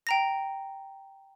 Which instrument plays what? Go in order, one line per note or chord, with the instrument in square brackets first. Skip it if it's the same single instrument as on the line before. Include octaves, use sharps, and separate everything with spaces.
[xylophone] G5 A#5 A#6